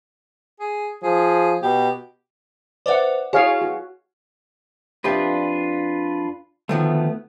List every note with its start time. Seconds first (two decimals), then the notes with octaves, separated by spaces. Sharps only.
0.60 G#4
1.03 F3 G#4
1.62 B2 G4
2.86 B4 C5 D5 E5 F#5
3.33 E4 F#4 G#4 C#5 F5
3.62 F#4
5.04 F2 D4 F4 G4 B4 E5
6.69 D2 D#3 F3 A3 B3